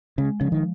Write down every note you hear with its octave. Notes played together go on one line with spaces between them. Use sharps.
C#3 G#3
C#3 F3
D#3